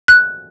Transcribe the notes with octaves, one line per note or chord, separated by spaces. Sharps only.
F#6